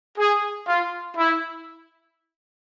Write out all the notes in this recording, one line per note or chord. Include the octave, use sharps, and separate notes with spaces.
G#4
F4
E4